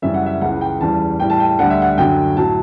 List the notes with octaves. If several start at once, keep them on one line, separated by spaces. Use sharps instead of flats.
F#2 C#3 E3 G3 E5
F#5
E5
C#2 C#3 E3 F#5
G5
E2 C#3 E3 G3 A5
A2 E3 G3 G5
A5
G5
D2 D3 G3 F#5
E5
F#5
F#2 D3 F#3 G5
A2 F#3 A5